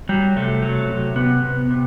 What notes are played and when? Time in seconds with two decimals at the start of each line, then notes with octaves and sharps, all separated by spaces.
0.09 F#3 G3
0.36 C3 A3
0.62 F#3
0.90 C3
1.16 C3 B3
1.42 C3
1.70 C3